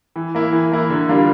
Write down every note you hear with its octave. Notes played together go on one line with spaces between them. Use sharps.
E3
A#3 E4
E3
A#3 E4
D3
G3 A#3 D4 F4